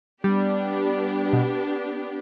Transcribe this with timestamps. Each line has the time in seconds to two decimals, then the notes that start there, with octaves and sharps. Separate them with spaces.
0.24 G3 B3 D4 G4
1.33 B2